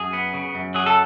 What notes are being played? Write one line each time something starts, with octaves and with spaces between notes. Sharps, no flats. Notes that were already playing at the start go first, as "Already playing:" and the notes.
Already playing: F#2 G#4
B3
C#3
F#2
F#3 G#4
A4